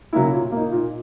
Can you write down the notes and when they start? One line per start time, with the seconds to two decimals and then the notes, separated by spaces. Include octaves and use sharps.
0.13 C#3 F#3 A#3 E4
0.33 A#2
0.52 A#3 D#4
0.72 A#2